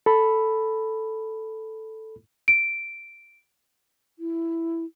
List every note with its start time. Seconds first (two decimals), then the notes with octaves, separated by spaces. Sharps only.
0.06 A4 B5
2.48 D7
4.19 E4